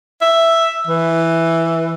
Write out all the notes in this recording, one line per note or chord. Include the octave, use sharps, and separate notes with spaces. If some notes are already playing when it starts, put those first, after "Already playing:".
E5
E3